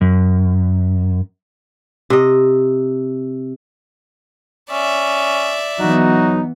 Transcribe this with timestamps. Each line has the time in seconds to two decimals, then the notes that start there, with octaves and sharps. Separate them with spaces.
0.01 F#2
2.10 C3 D#5
4.71 C#4 D5 E5
5.80 E3 F#3 B3 D#4 F#4